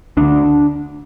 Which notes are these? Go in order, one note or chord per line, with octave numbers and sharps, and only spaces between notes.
D2 D3 D4